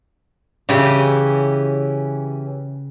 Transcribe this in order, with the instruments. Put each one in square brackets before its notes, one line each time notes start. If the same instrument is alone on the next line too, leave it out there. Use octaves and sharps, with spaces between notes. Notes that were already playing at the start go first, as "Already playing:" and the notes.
[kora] C#3 [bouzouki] E3 C#4 G4